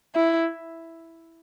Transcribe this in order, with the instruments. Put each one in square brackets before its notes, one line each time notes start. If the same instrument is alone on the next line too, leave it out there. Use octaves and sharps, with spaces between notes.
[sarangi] E4